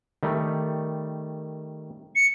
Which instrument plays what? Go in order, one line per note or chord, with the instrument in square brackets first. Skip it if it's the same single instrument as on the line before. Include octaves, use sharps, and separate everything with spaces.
[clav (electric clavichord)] D#3 G3 A3
[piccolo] C#7